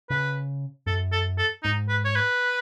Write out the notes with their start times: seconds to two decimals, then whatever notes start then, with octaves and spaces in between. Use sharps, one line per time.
0.10 C#3 B4
0.86 F#2 A4
1.12 A4
1.39 A4
1.64 G#2 D#4
1.89 B4
2.05 C#5
2.16 B4